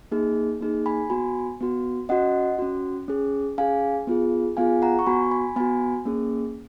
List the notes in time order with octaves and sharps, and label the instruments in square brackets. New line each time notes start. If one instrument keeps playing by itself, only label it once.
[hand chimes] A#3 D#4 G#4
A#3 D#4 G#4
G#5 B5
B3 F#4 G#5 B5
B3 F#4
C#4 F#4 D#5 F#5
C#4 F#4
C#4 G#4
C#4 G#4 F5 G#5
B3 F4 G#4
B3 F4 G#4 F5 G#5
F#5 A#5
C#6
B3 F#4 G#5 B5
G#5 B5
B3 F#4 G#5 B5
A#3 C#4 G#4